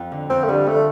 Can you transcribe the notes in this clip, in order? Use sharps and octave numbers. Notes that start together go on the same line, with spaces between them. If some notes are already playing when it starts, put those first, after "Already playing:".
Already playing: F2 F3
D3
F2 C4
A3
D3 G3
F2 A3